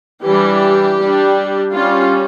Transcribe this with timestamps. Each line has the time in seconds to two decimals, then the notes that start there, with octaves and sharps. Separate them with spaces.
0.23 E3 G3 D4 G4
0.99 G3 D4
1.72 G3 C#4 F4